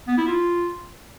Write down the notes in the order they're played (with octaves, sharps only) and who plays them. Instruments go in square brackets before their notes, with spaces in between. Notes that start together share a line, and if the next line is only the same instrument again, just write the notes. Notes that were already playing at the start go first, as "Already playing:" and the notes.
[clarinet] B3
E4
F4